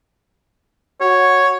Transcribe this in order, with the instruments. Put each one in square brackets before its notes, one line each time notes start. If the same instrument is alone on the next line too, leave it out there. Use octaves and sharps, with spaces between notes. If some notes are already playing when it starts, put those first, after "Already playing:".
[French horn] F#4 [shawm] C#5